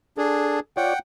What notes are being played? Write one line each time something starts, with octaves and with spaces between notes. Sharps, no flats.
D4 G#4 A4
F4 C#5 D5 F#5 G5